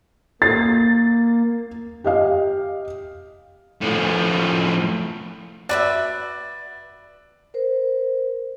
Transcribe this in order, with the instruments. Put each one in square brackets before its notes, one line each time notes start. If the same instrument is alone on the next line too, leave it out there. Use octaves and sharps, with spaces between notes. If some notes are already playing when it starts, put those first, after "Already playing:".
[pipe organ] A#3 [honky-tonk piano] A6 C7
[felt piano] G4 D#5 F5
[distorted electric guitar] A2 F3
[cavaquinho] F#4 B4 E5 [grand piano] D5
[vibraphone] A#4 C5